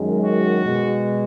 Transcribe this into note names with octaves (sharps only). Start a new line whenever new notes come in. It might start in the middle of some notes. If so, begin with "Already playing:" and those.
Already playing: F#2 D#3 G#3
F#4
B2 G#3